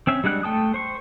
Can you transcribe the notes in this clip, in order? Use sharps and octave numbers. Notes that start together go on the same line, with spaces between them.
C4 C#4 E5
G3 G#3 D4 F#5 F#6
A3 G5 A5 D#6
C5 C#6